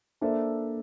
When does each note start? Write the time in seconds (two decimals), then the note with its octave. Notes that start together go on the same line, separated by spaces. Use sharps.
0.21 A#3 D4 A4 C5 E5